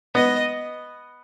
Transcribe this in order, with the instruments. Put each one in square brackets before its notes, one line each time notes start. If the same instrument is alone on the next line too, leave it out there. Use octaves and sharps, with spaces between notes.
[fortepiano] B3 [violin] D#5